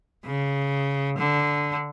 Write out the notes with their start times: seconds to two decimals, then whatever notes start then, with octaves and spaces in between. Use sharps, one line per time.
0.25 C#3
1.18 D3